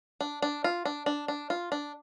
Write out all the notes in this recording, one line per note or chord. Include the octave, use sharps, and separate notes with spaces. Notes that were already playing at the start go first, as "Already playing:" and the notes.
D4
D4
F4
D4
D4
D4
F4
D4